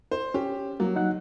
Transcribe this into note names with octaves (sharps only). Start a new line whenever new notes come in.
C5
C#4 G4
F#3 A#3
D#4 F#5 F#6